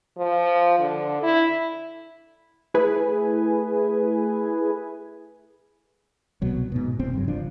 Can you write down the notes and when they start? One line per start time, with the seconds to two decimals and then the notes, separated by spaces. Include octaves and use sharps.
0.17 F3
0.79 D3
1.23 E4
2.74 A3 E4 G#4 B4 G#5
6.42 C2 B2 F#3
6.72 G#2 B2
6.99 G1 C2 C4
7.13 G2 C#3 F#3
7.28 F#1 F3 D4